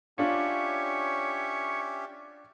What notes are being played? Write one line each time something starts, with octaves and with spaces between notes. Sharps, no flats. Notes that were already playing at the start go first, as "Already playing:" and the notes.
C#4 D4 F4 G4 C#5 E5